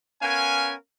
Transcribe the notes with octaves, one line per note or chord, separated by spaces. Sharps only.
B3 C#4 A#4 F5 G#5